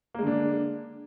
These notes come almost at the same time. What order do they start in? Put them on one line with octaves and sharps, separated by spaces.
A#3 G#3 D3 D4